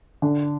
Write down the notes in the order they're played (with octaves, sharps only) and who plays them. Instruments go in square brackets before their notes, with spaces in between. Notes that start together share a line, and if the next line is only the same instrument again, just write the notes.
[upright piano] D3